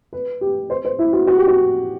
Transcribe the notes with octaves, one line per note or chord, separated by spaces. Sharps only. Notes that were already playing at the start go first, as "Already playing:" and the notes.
B4
G4
C5
C5
E4
F#4
F#4
G4
F#4